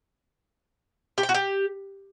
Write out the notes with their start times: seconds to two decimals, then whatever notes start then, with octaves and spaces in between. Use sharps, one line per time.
1.18 G4
1.23 G5
1.29 F#4
1.34 G4